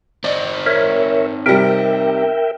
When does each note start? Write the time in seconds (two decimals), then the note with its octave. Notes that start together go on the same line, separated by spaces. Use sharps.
0.24 C4 D#4 D5
0.66 A#4 C#5 E5
1.46 C3 G3 A#4 E5 G5